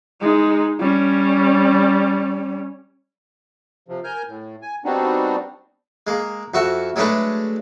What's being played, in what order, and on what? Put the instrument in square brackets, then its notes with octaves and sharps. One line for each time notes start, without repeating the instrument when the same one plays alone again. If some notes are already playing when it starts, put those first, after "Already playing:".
[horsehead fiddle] G#3 D#4
G3 C#4
[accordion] C3 F3
A#4 G#5 F6 G6
A2
G#5
G3 B3 C4 D4 D#4 F#4
[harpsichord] G#3 A#3
F2 F#4 E5 F#5
F#3 G#3 A3 C#4 D4 B4